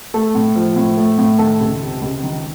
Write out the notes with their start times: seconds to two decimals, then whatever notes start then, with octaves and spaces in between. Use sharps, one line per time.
0.14 A3 A4
0.35 A2
0.55 F3
0.76 A2
0.97 A3
1.18 A2
1.39 D#3 A4
1.60 C#2
1.81 C3
2.01 C#2
2.23 D#3